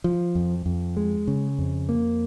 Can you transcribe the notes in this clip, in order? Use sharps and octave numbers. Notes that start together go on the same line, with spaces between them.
F3
F2
F2
G#3
C#3
F2
A#3